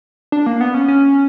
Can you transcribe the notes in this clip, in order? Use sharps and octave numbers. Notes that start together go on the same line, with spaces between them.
D4
A#3
B3
C#4
C#4